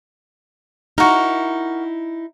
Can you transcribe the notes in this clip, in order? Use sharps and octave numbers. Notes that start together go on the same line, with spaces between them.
D#4 E4 F#4 A#4